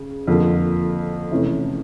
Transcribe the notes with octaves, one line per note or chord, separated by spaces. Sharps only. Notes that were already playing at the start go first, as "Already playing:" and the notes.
Already playing: C#3
F2 D3 F3 A#3
E2 C3 E3 A3 C#4